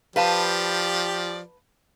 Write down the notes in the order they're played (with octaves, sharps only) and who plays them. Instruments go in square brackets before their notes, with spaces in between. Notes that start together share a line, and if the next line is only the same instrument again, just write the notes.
[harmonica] F3 G4 D5 [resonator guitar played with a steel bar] B4 F5 A5